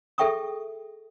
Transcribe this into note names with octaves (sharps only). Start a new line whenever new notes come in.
G#4 A4 E5 G5 C#6 D#6